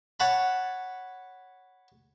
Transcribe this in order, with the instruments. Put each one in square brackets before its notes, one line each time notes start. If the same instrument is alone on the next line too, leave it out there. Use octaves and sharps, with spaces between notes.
[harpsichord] C#5 F#5 A5 B5